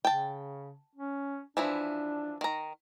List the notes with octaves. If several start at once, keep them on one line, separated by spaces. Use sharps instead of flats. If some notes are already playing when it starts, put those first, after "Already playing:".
C#3 G5 A5
C#4
E3 F3 D4 E4
D#3 A#5